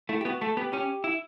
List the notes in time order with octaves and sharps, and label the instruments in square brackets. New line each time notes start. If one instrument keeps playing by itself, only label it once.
[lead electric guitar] A3 [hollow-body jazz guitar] E4
[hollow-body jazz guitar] G4
[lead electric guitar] B3 [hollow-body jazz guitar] F#4
[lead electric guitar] A3 [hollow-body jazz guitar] A4
[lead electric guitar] B3 [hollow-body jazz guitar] G4
[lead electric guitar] C#4 [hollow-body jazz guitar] G4
[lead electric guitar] E4